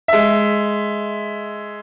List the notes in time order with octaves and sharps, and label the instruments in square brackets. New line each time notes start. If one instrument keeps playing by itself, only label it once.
[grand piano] G#3 E5